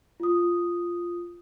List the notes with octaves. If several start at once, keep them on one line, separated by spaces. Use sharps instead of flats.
F4 D#6